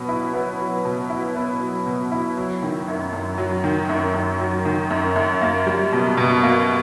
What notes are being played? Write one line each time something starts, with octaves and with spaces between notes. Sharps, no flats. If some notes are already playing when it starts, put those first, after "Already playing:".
Already playing: B2 F#3 B3
E4
B3
F#3
B2
E4
B3
F#3
B2
E4
F#3
D#3
F#2
F#2
F#3
D#3
F#2
F#2
F#3
D#3
F#2
F#2
A#3
G3
B2
B2
A#3